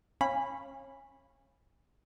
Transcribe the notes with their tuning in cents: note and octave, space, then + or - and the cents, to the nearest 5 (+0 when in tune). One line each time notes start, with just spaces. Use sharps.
C#4 -20 F5 +0 B5 +0